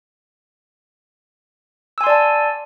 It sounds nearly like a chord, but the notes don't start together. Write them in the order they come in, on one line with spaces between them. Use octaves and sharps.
E6 G#5 C6 D5 A5